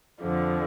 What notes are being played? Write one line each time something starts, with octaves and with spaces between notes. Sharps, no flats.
F2 D3 F3